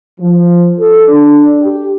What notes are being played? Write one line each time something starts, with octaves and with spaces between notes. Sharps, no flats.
F3
A4
D4
G4